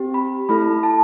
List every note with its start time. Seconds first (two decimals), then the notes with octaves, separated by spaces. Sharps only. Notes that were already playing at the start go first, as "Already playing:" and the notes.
Already playing: C4 G4
0.14 B5
0.49 A3 E4 A4 B5
0.83 A5